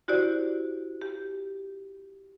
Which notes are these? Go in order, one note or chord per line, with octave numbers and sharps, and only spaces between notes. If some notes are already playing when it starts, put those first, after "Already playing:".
E4 F#4 G4 C5 D5
G4